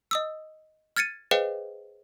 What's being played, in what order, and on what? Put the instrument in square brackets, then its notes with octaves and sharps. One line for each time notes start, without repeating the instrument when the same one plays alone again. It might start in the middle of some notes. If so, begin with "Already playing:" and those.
[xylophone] D#5 D#6 E6
F6 G#6 A6 C#7 D#7
G#4 B4 C5 D#5 F5 G5